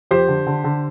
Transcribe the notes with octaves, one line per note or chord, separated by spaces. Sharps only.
F2 G4 C5
D3
D3
D3